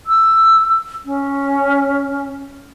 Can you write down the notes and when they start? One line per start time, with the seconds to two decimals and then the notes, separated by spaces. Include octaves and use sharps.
0.06 E6
1.05 C#4